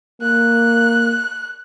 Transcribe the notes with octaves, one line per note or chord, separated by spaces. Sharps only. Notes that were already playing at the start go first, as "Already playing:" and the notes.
A#3 F#6